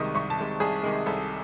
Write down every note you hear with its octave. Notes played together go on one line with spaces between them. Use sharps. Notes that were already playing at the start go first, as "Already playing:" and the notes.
Already playing: C2 C3 D#3 G#3 C#6 D#6
C2 C#6
A5
C3 D#3 G#3
C2 G#4
C3 D#3 G#3
C2 A4